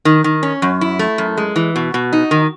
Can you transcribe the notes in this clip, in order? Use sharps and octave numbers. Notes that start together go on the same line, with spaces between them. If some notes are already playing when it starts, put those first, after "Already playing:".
D#3
D#3
C#4
F#2
E4
A3
F#2
G#3
E3
B2
B2
D#4
D#3